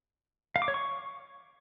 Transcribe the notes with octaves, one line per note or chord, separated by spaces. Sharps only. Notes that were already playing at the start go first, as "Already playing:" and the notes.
F5
D6
C#5
C#6